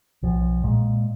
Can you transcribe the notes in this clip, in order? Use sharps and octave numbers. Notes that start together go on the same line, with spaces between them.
B1 F3
A#2 G#3